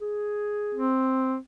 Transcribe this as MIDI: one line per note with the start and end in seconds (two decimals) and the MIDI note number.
0.01 0.89 68
0.75 1.36 60